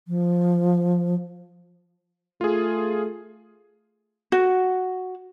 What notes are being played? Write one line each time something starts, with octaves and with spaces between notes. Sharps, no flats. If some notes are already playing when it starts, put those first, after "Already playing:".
F3
A3 F4 G#4
F#4